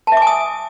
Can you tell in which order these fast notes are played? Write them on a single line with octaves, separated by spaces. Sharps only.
A5 E5 D6 G#5 D#6